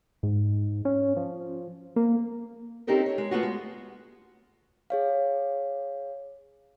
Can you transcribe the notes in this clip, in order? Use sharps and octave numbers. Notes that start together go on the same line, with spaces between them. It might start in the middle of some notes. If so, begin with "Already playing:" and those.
G#2
C#4
F3
A#3
C4 C#4 D#4 G4 A4 A#4
C#5
G#3
A3 B3 F4 F#4
G#3
G#4 C#5 F5